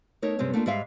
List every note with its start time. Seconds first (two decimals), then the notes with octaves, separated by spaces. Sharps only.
0.22 A3 D#4 A#4 C#5
0.39 G2 C3 G#3 C4 C#4
0.53 A3 A#3 D4 F4
0.66 G#2 G3 G#3 E5 F5